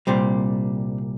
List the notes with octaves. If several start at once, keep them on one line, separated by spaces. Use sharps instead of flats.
C2 A#2 G3 C4